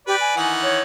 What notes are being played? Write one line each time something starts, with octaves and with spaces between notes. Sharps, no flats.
G4 B4 D5
G#5
D#3 E3 F#5
C#5